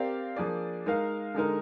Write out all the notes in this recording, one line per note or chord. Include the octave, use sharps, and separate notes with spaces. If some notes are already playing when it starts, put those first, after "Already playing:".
Already playing: C4 G4 A#4 D5 F5
F3 A#3 D4 G#4 D5
G#3 D#4 A#4 F5
D3 G#3 D#4 A#4